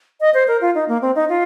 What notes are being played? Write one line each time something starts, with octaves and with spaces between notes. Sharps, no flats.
D#5
C5
A#4
F4
D#4
A#3
C4
D#4
F4